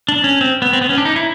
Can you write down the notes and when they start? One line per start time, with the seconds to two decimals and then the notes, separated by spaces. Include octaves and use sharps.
0.09 D4
0.24 C#4
0.41 C4
0.62 B3
0.73 C4
0.81 B3
0.89 C#4
0.98 D4
1.05 D#4
1.16 E4